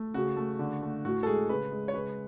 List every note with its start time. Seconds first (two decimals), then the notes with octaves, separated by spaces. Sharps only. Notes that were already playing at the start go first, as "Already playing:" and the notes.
Already playing: A3
0.14 C#3 F#4
0.36 A3
0.59 D3
0.82 A3
1.05 A2 F#4
1.23 A4
1.27 G#3 G#4
1.49 C#3 B4
1.72 G#3
1.88 C#5
1.94 C#3 B4